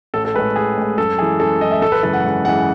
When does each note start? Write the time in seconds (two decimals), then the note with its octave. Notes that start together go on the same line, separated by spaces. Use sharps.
0.14 A1 A4
0.25 A4
0.34 A2 G#3 B4
0.56 A1 G#4
0.77 A2 G#3
0.98 F#2 A4
1.18 E3 G#3 G#4
1.39 F#2 A4
1.61 E3 G#3 D#5
1.71 E5
1.82 G#1 A4
1.92 B4
2.03 F#2 C#3 E3 G#3 A4
2.13 F#5
2.24 G#1
2.45 F#2 C#3 E3 G#3 F#5